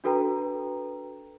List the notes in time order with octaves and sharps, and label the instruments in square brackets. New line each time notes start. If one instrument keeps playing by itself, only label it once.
[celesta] D4 F#4 A4 B4 G5 A#5